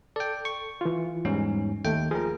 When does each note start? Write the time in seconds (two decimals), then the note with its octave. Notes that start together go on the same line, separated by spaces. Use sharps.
0.16 A4 D5 G5
0.45 C#6
0.81 E3 F4
1.25 E2 G#2 G3 C#4
1.84 D#2 A3 G5
2.11 F3 G#4 A#4